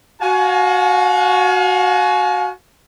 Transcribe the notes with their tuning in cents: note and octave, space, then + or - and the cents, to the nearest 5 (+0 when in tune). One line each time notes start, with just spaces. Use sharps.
F#4 +0 F5 +35 G#5 +35